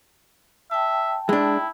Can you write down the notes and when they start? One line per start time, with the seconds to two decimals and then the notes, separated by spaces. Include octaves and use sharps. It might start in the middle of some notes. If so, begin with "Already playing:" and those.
0.71 E5 G5 A5
1.29 G#3 D4 E4